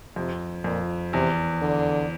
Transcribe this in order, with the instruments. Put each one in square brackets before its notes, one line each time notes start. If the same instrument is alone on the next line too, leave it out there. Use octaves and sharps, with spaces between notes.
[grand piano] F2 [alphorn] C3
[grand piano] F2 [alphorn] A#2
[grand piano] E2 [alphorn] C3
[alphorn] D3